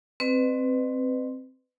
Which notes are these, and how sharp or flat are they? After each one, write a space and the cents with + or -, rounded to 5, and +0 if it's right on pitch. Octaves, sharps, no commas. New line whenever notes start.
C4 +0 B4 +25 D#5 -45